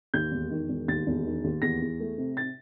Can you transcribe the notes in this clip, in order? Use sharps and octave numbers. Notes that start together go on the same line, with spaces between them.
D#2 G6
E1
D#3
E1
D#2 A6
E1
D#3
D#2
E2 A#6
E2
A3
C3
A6